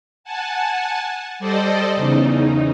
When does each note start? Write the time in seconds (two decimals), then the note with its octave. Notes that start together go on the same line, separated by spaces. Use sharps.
0.24 F#5 G#5 A5
1.39 G3 A4 C5 D5 D#5
1.96 E2 C#3 D#4